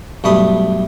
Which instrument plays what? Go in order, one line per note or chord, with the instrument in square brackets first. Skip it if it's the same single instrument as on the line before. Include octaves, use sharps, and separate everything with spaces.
[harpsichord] B1 G2 A3 B5 D#6